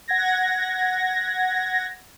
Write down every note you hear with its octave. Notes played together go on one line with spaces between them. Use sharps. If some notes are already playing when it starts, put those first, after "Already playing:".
F#5 G#6 A#6